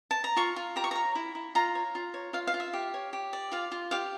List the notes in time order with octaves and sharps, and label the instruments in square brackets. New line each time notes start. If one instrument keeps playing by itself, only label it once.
[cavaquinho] A5
A#5
F4 C#6
F4
G4 A#5
C#6
C#5 A#5
E4
E4
F4 A#5
C#5
F4
C#5
F4 F5
F5
F4
E5
G4
C#5
G4
D5
F4 F5
F4
G4 F5